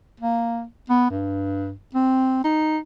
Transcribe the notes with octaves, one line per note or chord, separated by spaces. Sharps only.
A#3
B3
G2
C4
D#4